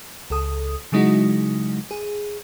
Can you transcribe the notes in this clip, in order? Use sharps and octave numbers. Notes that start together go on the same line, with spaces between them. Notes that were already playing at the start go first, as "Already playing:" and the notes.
C#2 A4 D#6
C#3 F#3 G#3 D#4 E4 F#4
G#4